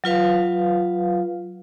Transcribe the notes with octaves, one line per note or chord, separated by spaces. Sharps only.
F#3 F4 B4 F5